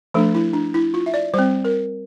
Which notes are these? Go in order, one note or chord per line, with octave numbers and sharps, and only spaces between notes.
F3 A3 D4 A4
E4
D4
E4
F4
E5
D5
G3 C4 C5
A#4